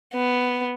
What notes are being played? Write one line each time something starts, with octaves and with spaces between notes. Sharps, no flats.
B3